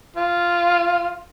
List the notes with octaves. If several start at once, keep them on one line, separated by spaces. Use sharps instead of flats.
F4